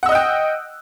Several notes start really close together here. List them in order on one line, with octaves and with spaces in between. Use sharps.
F#5 E6 D#5 F#6 G5